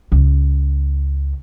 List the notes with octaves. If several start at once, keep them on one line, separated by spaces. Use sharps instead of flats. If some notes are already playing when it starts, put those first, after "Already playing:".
C#2